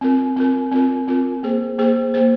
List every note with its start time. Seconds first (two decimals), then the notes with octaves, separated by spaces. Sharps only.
0.01 C4 F4 A#4
0.37 C4 F4 A#4
0.71 C4 F4 A#4
1.08 C4 F4 A#4
1.43 A#3 G#4 C5
1.78 A#3 G#4 C5
2.14 A#3 G#4 C5